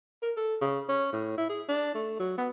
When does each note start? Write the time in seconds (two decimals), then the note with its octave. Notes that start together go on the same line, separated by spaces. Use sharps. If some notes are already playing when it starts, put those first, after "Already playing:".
0.22 A#4
0.37 A4
0.61 C#3
0.89 C#4
1.13 A2
1.38 E4
1.49 G#4
1.68 D4
1.95 A3
2.20 F#3
2.38 B3